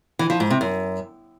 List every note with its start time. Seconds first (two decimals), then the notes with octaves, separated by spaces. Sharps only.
0.19 E3
0.30 F3
0.40 G#2
0.50 C3
0.61 F#2